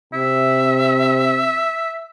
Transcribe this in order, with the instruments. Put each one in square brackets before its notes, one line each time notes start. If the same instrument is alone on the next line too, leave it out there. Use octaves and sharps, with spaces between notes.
[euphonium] C3 [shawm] E5